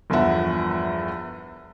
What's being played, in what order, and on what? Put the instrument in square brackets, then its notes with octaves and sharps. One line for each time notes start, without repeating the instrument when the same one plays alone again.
[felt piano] G1 E2 F3 A#4 E5 F#5